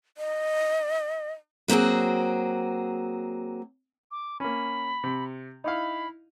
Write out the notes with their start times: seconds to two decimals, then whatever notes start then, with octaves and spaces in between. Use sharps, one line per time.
0.17 D#5
1.68 F#3 A#3 C4 F#4 G#4
4.11 D6
4.40 A#3 C#4 B5
5.04 C3
5.64 D#4 E4 F5 B5